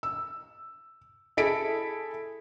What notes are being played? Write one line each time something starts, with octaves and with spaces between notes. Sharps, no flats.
E6
E4 G#4 A4 B6 D7